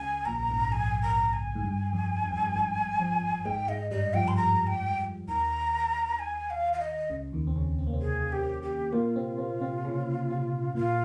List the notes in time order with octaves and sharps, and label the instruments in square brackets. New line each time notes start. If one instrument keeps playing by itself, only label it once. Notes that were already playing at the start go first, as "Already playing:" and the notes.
Already playing: [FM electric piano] C#2 C#3 [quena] G#5
[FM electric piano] A#1 A#2 [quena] A#5
[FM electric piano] G#1 G#2
[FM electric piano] F2 [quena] G#5
[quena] A#5
G#5
[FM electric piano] G#2
G2
F2
G2
F2
G2
G#1 G#2
F2 F3
[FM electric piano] G#2 G#3 [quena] G5
[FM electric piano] G#2 G#3 [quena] D#5
[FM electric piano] G2 G3 [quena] D#5
[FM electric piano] F2 F3 [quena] G5
[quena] C6
A#5
G5
[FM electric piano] D#2 D#3 [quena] A#5
[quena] G#5
F5
F5
D#5
[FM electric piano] C#2 C#3
D#2 D#3
C4
C#3 C#4
C4
A#3
C3 C4
[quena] G#4
G4
G4
[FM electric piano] A#2 A#3 [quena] F4
[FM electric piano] C3 C4
C3 C4
C3 C4
C#3 C#4
C3 C4
[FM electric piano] A#2 A#3 [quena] F4